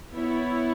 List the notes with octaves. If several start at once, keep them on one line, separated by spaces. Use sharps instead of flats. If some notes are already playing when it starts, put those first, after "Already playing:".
B3 E4 C#5